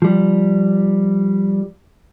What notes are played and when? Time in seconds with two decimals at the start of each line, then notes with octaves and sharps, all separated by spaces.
0.02 F3 G3